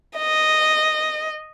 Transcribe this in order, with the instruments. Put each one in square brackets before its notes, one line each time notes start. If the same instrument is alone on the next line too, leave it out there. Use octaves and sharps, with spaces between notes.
[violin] D#5